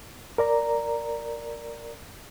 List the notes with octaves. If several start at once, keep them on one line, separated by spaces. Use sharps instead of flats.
A#4 D5 A#5